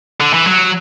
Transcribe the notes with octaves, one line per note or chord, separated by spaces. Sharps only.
D3
E3
F#3